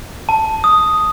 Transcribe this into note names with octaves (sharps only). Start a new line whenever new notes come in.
A5
D#6